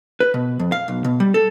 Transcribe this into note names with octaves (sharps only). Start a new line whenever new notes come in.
B4
B2
F2
F5
B1
B2
G3
A4